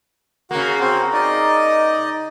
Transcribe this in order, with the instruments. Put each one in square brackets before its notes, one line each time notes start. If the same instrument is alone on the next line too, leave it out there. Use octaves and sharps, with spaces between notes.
[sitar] C#3 A#3 [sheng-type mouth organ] F#4 F#5
[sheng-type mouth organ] C4 F#4 C5
D#4 D5 D#5